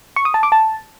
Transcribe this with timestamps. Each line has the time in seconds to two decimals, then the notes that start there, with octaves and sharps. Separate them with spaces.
0.16 C#6
0.25 D#6
0.34 A5
0.43 D6
0.52 A5